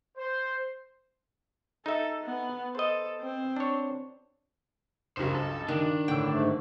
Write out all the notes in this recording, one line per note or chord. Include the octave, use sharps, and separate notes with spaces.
C5
D#4 A4 E5
B3
A4 C5 D#5
C4
D4 C#5
C#2 G2 F#3 A#4 C5
A4
D#3 D4
G1 A2 D3 G5 E6
G#2 A3